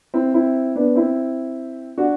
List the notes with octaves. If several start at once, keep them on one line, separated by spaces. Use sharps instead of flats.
C4 E4
C4 E4
B3 D4
C4 E4
D4 F#4